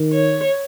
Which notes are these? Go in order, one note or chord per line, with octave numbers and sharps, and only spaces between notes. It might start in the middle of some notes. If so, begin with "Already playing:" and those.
Already playing: D#3
C#5